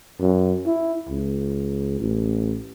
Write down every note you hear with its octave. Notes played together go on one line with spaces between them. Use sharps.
F#2
E4
C#2
A1